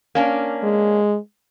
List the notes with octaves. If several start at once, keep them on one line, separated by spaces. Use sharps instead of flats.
A#3 C#4 D4
G#3